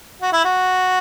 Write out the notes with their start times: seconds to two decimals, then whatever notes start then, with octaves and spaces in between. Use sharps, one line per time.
0.22 F#4
0.33 E4
0.45 F#4